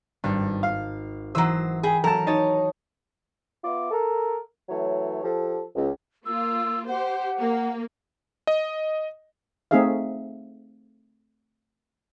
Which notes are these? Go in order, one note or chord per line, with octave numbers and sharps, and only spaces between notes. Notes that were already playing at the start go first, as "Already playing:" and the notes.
G#1 G2
F5
E3 F#3 C5 D#6 E6
G#4 G5 B5
F#3 A4 A#4 A5
D#4 C#5 D#5 A5
B3 F4 E5 D6
A4 A#4
E3 F#3 A3 C#5
F3 G4 A4
C#2
A#3 F4 E6
G4 C5 F#5
A#3
D#5
A3 C4 D#4 G#4 E5 F5